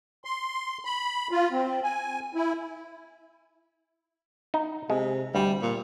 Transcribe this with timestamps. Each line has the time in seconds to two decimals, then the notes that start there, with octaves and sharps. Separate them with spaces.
0.25 C6
0.85 B5
1.31 F4
1.52 C4
1.83 G#5
2.35 E4
4.54 D#4
4.90 C3 G#3
5.35 D2 G3
5.62 A#2